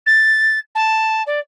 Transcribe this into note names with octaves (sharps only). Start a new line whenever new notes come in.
A6
A5
D5